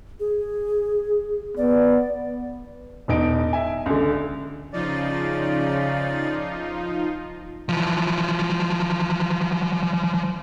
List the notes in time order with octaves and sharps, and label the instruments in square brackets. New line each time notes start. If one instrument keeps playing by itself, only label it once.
[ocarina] G#4
[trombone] B3 [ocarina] D5
[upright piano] E1 E2 D#4 D7
E5 G#5
C#2 D3
[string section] C#3 [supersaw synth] F3 D#4 F4 [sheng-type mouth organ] D5
[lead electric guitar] E3 F3